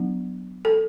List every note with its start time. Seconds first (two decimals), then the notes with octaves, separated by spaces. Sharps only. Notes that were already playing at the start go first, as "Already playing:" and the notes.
Already playing: F#3 B3 D4
0.65 A4